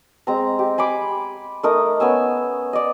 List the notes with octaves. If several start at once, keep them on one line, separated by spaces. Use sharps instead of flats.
G#3 C4 A#5
G4
G#5 B5 C6 D6
A3 D#4 A#4 D#6
B3 C#4 G#5 E6
D5 D#5